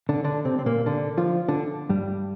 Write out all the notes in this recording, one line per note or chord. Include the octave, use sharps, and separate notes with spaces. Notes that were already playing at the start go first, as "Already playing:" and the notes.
D3 D4
D3 D4
C3 C4
C4
A#2 A#3
D3 D4
F3 F4
D3 D4
G2 G3